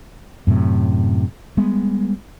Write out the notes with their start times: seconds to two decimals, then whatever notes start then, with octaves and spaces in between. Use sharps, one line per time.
0.47 F#2 A2 C3
1.57 G3 G#3 B3